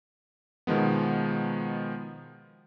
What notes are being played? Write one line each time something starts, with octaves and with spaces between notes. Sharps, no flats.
B2 D#3 F3 G#3 B3